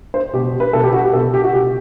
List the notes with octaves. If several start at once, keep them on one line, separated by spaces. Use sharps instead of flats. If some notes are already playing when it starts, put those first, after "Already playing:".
C5
B2 G4
B4
B2 A4
G4
F#4
G4
B2 A4
G4
F#4
B2 G4